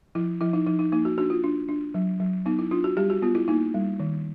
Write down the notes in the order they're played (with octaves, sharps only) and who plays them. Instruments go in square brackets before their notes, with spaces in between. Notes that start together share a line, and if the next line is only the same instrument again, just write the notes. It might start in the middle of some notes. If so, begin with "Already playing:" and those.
[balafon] F3 E4
F3 E4
D#4
F3 D#4
D#4
A#3 D#4
F#4
D4 F#4
F4
D4
D4
F#3
F#3
B3 D#4
E4
D4 F4
F#4
G3 G4
F#4
B3 F4
E4
A#3 D#4
G3
D#3